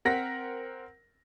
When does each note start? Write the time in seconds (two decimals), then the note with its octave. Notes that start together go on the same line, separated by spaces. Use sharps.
0.05 C4 A#4 F#5 A#6 B6